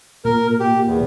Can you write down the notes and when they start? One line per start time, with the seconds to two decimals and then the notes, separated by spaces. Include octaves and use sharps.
0.25 A#2 A#4
0.60 G4
0.87 E2